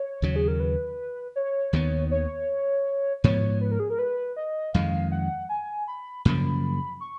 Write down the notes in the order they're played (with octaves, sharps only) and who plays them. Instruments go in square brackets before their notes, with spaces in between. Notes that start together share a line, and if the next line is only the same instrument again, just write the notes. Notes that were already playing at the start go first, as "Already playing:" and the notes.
Already playing: [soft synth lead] C#5
[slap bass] D#2 C#3 F#3
[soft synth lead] G#4
A#4
B4
C#5
[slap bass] D#2 D#3 G#3 B3
[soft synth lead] C#5
[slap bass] G#2 F3 B3 [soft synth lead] C#5
[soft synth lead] B4
A#4
G#4
A#4
B4
D#5
[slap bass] F2 D#3 G#3 [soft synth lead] F5
[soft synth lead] F#5
G#5
B5
[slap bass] F#2 C#3 F3 A#3 [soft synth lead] B5
[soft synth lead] C#6